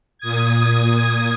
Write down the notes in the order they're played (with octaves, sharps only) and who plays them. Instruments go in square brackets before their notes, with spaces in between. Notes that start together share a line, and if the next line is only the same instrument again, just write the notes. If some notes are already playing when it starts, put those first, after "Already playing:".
[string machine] A#2 D#6 G#6